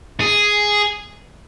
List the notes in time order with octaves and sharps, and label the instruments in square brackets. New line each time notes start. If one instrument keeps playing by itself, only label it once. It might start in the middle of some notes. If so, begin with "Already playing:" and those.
[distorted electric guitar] G#4